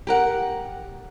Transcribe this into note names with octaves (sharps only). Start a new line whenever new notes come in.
G4 A#4 F#5